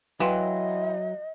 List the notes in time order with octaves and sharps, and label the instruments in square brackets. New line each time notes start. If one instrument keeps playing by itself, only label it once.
[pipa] E3 [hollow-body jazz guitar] F#3 [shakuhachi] D#5 [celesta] F5 G5 C6